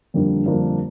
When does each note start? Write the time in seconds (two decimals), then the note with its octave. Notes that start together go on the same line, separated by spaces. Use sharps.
0.14 F2 D3 G3 A#3 D4
0.46 F2 D3 G3 A#3 D4